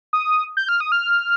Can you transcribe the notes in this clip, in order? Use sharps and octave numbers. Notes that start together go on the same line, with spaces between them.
D#6
G6
F6
D#6
F6